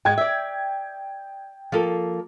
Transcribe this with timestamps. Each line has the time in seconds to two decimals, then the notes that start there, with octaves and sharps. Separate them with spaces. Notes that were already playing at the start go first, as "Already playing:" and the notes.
0.05 G#2 G#3 G5 G#6
0.18 D5 E5
1.72 F3 A#3 A4